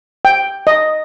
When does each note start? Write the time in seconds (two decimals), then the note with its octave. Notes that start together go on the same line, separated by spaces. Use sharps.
0.25 G5
0.67 D#5